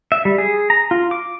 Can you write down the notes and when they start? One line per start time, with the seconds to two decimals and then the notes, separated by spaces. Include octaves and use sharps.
0.12 E5
0.25 G3
0.38 G#4
0.70 A#5
0.91 F4
1.11 D6